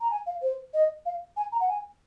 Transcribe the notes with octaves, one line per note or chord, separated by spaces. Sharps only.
A#5
G#5
F5
C5
D#5
F5
G#5
A#5
F#5
G#5